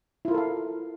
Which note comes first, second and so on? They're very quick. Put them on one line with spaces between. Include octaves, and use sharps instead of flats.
E4 F4 A#4 A4 F5